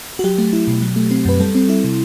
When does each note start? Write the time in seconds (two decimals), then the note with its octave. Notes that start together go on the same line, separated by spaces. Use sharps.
0.19 F#4
0.24 F#3 G4
0.38 A3
0.53 E4
0.68 B2
0.82 F#3
0.96 A3
1.11 C4
1.25 F#2 B4
1.40 G3 A4
1.55 C4
1.69 E4
1.84 C3